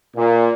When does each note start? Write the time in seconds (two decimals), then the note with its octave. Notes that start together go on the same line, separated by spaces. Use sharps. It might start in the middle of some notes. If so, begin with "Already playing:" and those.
0.16 A#2